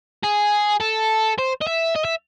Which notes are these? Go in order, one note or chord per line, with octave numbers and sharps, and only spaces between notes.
G#4
A4
C5
D#5
E5
D#5
E5